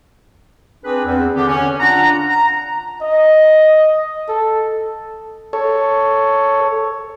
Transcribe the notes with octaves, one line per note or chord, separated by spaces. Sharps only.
C4 D4 G#4 B4
E2 C4
D3 G4
C#4
D4 F4 F#5 A#5
A#5
D#5
A4
A4 C#5